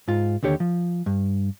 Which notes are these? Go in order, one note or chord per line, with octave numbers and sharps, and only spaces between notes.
G#2 F4
D#2 D3 G4 C#5
F3
G2